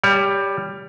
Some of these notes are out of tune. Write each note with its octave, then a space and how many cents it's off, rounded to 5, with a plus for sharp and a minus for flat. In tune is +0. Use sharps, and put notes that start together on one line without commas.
G3 +10 C#5 +40